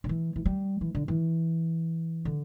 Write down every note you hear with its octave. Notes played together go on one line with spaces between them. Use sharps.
D3
E3
E3
G3
E3
D3
E3
D3